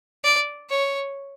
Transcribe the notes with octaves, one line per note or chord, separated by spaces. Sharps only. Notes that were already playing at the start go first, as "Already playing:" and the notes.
D5
C#5